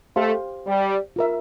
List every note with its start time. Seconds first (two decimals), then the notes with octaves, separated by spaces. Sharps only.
0.16 A3 G4 C5 F5 C6
0.67 G3
1.16 F4 A#4 E5